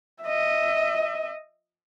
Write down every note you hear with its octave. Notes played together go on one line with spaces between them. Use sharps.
D#5 E5